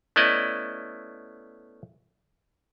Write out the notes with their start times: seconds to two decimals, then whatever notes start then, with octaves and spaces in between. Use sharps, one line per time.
0.16 A3 B3 C#4 E4 D5 D#5